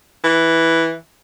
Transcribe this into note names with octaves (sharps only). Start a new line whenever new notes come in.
E3